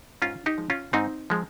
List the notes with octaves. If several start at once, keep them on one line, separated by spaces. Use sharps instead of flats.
G#2 C#4 F4
D#4 G4
F3 G#3
C#4 F4
G#2 C4 D#4
F3 G#3